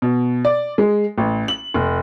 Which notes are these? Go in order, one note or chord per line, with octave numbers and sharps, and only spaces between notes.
B2
D5
G#3
A1
F#7
F1